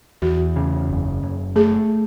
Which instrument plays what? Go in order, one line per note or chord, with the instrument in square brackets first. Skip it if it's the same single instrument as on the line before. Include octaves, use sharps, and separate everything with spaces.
[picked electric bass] E2 [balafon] F#4
[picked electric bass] C#3
F#1
F#1
[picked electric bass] A3 [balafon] G#4